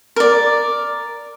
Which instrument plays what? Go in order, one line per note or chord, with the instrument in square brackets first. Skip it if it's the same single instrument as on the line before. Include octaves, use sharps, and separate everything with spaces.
[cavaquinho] A#4 D5